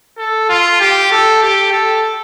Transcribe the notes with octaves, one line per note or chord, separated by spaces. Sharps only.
A4
F4
G4
A4
G4
A4